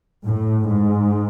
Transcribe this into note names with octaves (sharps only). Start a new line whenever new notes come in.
A2
G#2